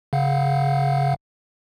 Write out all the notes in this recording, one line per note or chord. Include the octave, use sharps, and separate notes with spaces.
C#3 F5 F#5